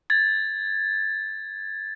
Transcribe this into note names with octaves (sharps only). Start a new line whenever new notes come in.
G#6 A6